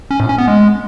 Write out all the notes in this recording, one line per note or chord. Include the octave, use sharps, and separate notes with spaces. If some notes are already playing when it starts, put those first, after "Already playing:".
C#4
A2
C#4
B3
G#3